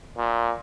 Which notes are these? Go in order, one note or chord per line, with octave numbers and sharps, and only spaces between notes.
A#2